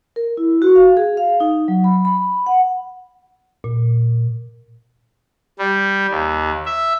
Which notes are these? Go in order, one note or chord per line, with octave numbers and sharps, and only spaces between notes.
A#4
E4
F#4
F5
G#4
F5
D#4
F#3
B5
B5
F#5
A#2
G3
D#2
E5